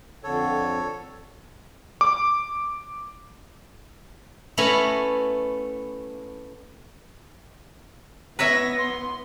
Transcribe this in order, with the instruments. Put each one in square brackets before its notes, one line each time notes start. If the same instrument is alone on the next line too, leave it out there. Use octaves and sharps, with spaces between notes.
[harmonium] F2 D3 [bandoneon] A4 C#5
[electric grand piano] D6
[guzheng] A3 B3 C#4 E4 A#5 B5
[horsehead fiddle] B3 [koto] B4 C#5 E5 [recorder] A#6
[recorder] C6